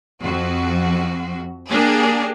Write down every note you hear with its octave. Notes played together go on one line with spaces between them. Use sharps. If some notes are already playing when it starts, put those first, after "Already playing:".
F2 F#4
A#3 D4 G4 G#4